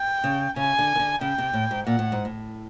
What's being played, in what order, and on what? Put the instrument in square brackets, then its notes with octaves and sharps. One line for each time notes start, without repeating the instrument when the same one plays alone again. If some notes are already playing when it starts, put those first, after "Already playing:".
Already playing: [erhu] G5
[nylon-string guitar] C#3
[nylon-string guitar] C#3 [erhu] G#5
[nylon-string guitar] D3
D#3
D3
[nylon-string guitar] C#3 [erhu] G5
[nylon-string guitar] C3
A2
G#2
[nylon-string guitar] A#2 [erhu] F#5
[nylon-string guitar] A2
G#2
A2